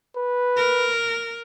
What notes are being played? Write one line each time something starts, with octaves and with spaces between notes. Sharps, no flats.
B4
A#4